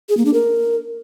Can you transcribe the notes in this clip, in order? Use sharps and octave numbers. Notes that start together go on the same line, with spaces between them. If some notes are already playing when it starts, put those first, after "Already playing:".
G#4
A#3
D4
A#4